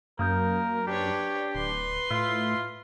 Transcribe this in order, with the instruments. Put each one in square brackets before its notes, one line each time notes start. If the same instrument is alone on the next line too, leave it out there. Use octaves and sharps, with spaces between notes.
[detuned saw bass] F#2 [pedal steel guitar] A#3 D#6 G6 [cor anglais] A#4
[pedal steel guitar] D4 [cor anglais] G4 [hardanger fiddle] B4 C#5
[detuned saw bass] D1 [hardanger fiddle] B4 C6
[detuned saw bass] A2 [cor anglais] F4 [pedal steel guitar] E5